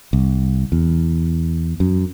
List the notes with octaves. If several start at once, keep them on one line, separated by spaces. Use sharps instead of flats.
C2
E2
F#2